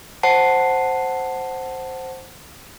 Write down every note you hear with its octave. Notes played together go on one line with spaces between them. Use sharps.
C5 F#5 A5 C7